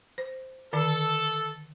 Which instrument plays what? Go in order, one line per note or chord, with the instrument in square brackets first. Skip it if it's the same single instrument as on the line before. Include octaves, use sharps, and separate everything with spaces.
[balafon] C5
[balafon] D3 D#3 A5 [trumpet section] A4